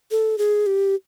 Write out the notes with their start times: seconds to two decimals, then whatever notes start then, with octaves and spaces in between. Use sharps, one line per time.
0.11 A4
0.38 G#4
0.66 G4